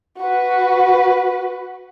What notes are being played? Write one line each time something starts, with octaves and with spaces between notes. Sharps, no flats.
F#4 B4